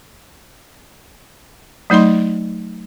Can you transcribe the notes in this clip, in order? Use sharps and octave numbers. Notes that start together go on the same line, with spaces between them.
F#3 A3 D#4 D#5 C6